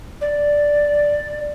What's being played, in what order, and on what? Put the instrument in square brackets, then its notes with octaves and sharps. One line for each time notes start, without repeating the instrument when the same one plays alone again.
[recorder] D5